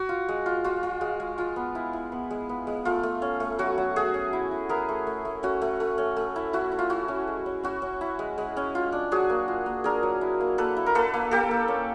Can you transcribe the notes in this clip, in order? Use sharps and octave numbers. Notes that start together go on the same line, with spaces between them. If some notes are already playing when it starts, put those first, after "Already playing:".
Already playing: F#4
F4
G#3
F4
F4 F#4
F4
G#3
G#3
G#3 F4
B3
E4
E4
B3
G#3
B3
G#3
A3 F4
A3
C#4
A3
F#3 F#4
F#3
A3 F#4 G#4
C#4
E4
E4
E4 G#4 A#4
A3
A3
A3
C#4 F#4
A3
A3
C#4
A3
E4
E4 F#4
E4
F4
E4 F#4
C#4
G#3
C#4
C#4 F#4
C#4
E4
G#3
G#3
C#4
F4
D4
F#3 F#4 G#4
A#3
F4
A#3
D4 G#4 A#4
F#3
E4
A#3
A#3 A4 B4
E4
A#4
A#3 A4 B4
A#3
A#3 G4 A4
A#3
C#4